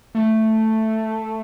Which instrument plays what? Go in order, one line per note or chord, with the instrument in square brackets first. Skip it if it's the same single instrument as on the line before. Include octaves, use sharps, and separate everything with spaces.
[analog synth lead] A3